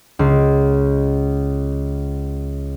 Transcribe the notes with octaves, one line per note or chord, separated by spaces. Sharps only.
C#2 C7